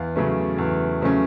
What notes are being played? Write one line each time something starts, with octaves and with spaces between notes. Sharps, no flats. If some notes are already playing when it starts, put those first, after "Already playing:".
Already playing: E2 F5
C#3 F#3 A3 C#4
E2
C#3 F#3 A3 C#4